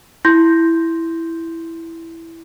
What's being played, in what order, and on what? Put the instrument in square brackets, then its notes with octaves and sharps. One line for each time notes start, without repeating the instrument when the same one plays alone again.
[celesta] E4 C6 G6 A#6